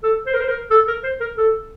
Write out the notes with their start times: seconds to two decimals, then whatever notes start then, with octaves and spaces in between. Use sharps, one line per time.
0.03 A4
0.26 C5
0.34 A#4
0.41 C5
0.48 A#4
0.71 A4
0.88 A#4
1.03 C5
1.20 A#4
1.37 A4